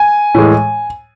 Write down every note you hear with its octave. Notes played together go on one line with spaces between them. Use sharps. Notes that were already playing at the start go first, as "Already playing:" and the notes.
Already playing: G#5
A2 E3 G#3